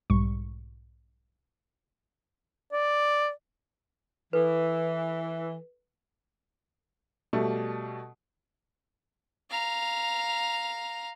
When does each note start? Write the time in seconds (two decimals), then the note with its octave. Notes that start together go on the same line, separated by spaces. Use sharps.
0.10 B1 G#2 G3 C#6
2.72 D5
4.33 E3 A4 B4
7.33 B2 G3 A3
9.51 F5 A#5